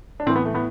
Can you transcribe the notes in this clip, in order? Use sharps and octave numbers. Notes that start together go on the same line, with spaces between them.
D4
A2 E3 C4
B3
A3
A2 B3